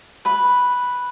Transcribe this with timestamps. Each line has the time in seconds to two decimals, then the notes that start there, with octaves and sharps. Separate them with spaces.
0.25 B4 B5